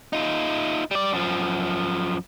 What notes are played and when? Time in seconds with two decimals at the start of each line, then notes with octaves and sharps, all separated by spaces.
0.13 D#4 F4
0.91 G3 D5
1.13 F#2 F3